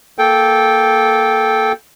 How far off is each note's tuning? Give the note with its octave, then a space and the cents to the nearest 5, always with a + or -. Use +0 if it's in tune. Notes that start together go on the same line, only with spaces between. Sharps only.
A#3 +5 A4 -15 G5 +0